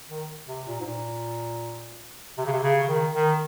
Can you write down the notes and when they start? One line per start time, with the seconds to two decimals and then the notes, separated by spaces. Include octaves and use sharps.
0.09 D#3
0.47 C3
0.66 A#2
0.80 G#2
0.86 A#2
2.38 C3
2.46 C#3
2.53 C3
2.63 C#3
2.83 C#3
2.89 D#3
3.14 D#3